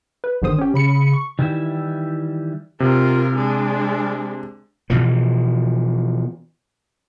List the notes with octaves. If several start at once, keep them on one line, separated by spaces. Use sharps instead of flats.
B4
G1 D3 D#3 C5 D#6
C#4 G4
C#3 B5 C#7
C#6
D#3 E3 G3 E4 E5
C3 F4 A#4
G#3 D4
B2 E3 F3